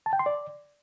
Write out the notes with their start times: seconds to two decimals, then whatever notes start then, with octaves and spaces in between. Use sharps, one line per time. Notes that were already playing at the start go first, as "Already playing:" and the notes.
0.06 A5
0.13 G5
0.19 C6
0.26 D5